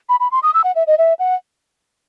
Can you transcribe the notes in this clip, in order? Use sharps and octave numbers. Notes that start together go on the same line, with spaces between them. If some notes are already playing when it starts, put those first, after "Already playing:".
B5
B5
C6
D#6
E6
F#5
E5
D#5
E5
F#5